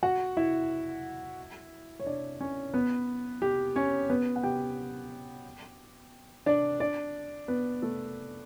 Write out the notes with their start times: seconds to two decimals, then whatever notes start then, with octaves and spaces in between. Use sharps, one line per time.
0.03 F#4 F#5
0.37 E4 E5
2.00 C#5
2.06 D4 D5
2.41 C#4 C#5
2.74 B3 B4
3.42 G4
3.76 C#4 C#5
4.10 B3 B4
4.36 F#5
4.43 G4 G5
6.46 D4 D5
6.80 D4 D5
7.48 B3 B4
7.82 A3 A4